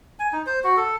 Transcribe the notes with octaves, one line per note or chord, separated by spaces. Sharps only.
G#5
D#4
C5
F#4
A4